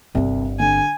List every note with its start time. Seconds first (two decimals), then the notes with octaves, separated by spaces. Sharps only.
0.15 G1 C2 C4
0.59 D3 G#5